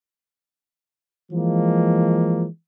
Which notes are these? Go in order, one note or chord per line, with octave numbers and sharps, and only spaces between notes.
E3 F3 G#3 A#3